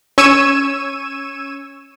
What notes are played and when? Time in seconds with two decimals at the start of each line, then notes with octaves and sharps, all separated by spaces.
0.18 C#4 C#6 E6 G#6 D#7 E7